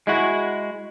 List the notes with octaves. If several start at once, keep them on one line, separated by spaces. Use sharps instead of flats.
G#3 E4 F#4